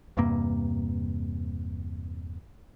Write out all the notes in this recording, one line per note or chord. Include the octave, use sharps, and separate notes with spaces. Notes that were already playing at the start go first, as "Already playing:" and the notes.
E2 G2 C3 A#3